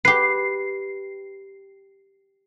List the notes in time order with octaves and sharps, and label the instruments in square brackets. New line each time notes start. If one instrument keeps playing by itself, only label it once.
[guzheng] G4 B4 [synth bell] C7